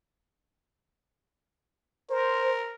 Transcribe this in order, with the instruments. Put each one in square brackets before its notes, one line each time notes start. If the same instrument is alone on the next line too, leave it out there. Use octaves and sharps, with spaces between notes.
[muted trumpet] A#4 [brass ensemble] C5